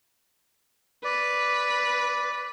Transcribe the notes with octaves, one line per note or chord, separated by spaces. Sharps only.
B4 D5